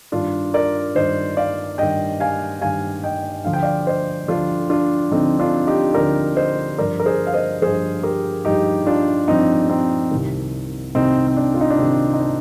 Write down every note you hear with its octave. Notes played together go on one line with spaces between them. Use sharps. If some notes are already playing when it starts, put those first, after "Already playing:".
G2 D#3 D4 F4
A#4 D5
G2 D#3 C5 D#5
D5 F5
G2 D#3 D#5 G5
F5 G#5
G2 D#3 F5 G#5
D#5 G5
D2 D3 F3 F5
G5
D5 F5
C5 D#5
D2 D3 F3 D4 F4
D4 F4
D2 D3 F3 C4 D#4
D4 F4
D#4 G4
D2 D3 F3 A#4 D5
C5 D#5
G2 F3 A#4 D5
A#4
G#4 C5
F5
C5 D#5
G2 F3 G#4 C5
G4 A#4
G2 F3 D#4 G4
D4 F4
G2 F3 C4 D#4
C4 D#4
C2 C3 D#3
C2 C3 D#3 C4 D#4
C4
D4
F4
D#4
D4
C2 C3 D#3 C4
D#4
D4